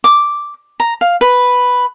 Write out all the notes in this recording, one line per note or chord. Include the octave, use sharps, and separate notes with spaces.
D6
A#5
F5
B4